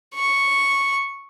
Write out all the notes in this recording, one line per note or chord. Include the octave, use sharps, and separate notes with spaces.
C#6